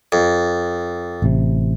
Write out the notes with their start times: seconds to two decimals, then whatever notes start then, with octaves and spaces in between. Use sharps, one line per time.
0.12 F2
1.22 A1 C3